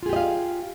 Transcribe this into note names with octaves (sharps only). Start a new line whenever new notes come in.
F4 G4 G#4 D#5 F5